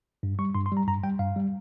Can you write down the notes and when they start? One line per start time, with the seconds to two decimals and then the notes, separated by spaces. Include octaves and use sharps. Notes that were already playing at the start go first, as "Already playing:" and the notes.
0.23 G2
0.39 G3 C#6
0.55 G2 C6
0.66 C6
0.72 G3 A#5
0.87 G2 A#5
1.04 G3 G5
1.19 G2 F5
1.36 G3